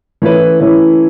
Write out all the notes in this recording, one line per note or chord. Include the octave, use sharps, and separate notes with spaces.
E3 A3 C#4 E4 B4
E3 A3 C#4 E4 B4